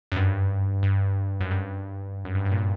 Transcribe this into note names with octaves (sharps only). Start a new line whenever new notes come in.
F#2
G2
G2
F#2
G2
F#2
G2
G2
A#2